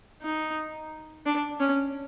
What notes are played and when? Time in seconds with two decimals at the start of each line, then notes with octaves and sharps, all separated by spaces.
0.22 D#4
1.26 D4
1.61 C#4